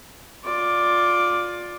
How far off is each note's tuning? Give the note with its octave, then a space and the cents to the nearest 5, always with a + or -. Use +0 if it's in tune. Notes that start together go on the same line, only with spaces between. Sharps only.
F4 +20 D5 +0